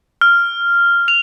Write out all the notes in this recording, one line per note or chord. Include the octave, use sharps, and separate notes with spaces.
F6
F7